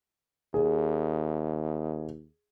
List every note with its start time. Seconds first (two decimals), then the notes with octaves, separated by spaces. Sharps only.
0.54 D#2 G#4